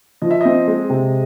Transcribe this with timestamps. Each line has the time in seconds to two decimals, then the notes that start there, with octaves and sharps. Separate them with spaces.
0.22 F3 D#5
0.31 E5
0.41 C4 D#5
0.67 G#3
0.90 C3